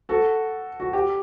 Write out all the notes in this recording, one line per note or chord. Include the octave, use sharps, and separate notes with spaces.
F#4 A4
F#4
G4